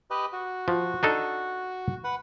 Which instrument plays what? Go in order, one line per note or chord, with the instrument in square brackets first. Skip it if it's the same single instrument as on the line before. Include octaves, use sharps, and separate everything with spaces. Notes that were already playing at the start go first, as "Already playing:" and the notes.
[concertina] G4 B4 D#5
F#4
[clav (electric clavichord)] F3
D4 D#4 A4
[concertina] B4 F#5